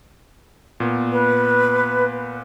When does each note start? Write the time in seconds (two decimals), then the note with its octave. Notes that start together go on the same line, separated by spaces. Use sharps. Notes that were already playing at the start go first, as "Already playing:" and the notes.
0.80 A#2 B3
1.12 B4